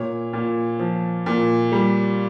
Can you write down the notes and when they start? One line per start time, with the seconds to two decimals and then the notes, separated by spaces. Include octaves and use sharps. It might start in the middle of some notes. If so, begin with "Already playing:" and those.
Already playing: A#2 C#5
0.33 A#2
0.79 F3
1.26 A#2
1.72 G3